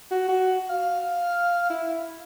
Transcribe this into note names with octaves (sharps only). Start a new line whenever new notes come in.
F#4
F#4
F5
E4